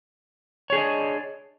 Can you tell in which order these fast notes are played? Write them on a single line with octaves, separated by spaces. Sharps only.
C#5 G#4 D4 D#5